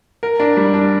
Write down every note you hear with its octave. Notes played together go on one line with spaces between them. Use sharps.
A#4
D4
G3
D4